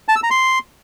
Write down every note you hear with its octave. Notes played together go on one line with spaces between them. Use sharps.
A5
E6
A#5
C6